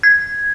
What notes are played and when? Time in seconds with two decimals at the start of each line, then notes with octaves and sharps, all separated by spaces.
0.03 G#6